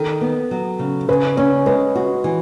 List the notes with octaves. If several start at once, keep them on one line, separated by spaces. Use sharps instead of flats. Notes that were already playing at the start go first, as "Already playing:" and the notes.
Already playing: D#3 A4
B3
F#3
C#3
C#3 B4
C#4 C#5
G#3 B4
F#4
E3